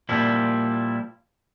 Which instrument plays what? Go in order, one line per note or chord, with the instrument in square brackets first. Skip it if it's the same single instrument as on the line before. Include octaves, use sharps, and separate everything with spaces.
[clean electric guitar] A#2 F3 G3 E4